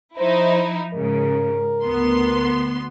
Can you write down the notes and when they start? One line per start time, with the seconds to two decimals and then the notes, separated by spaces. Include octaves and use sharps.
0.18 F3 D#4 E4 C5
0.94 G#2 C#3 A#4
1.85 D2 B3 C6